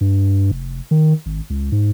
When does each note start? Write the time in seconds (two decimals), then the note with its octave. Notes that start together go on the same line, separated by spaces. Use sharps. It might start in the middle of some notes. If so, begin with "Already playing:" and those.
0.01 G2
0.51 F1
0.91 D#3
1.26 G#1
1.50 C#2
1.72 G#2